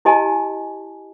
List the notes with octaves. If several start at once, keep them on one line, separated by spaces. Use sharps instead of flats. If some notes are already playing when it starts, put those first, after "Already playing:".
E4 G4 D#5 G#5 A5